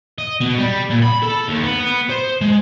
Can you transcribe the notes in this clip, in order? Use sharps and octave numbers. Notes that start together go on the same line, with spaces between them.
D#5
B2
G3
A#2
B5
A4
D#2
B3
B3
C5
G#3